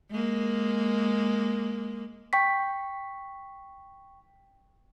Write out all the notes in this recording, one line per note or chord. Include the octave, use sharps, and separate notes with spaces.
G#3 A#3
G5 C#6 B6